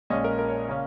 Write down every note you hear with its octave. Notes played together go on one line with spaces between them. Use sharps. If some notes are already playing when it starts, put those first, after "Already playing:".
A#1 A#2 G#3 C#4 D#5
A#4
A#4
C#5
C#3 A#3 C#4